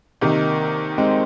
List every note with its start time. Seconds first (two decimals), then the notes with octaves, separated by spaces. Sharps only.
0.21 C2 C3 D#3 A#3 D#4
0.98 G#3 C4